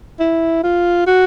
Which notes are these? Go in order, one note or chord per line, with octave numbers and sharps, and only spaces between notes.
E4
F4
F#4